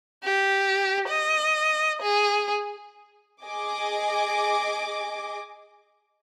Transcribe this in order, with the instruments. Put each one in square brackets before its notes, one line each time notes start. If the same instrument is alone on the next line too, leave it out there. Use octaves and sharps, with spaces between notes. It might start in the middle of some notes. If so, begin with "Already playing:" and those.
[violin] G4
D#5
G#4
[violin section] G#4 D#5 G#5 D6